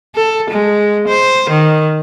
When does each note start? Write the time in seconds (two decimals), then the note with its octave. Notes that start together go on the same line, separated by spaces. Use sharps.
0.16 A4
0.50 G#3
1.08 C5
1.50 D#3